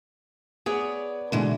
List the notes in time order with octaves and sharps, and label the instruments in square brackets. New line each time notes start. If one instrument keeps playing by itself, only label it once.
[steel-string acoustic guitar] B3 C#5 D5 [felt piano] G#4
[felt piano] B2 D3 [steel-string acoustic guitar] E3 G#3 A3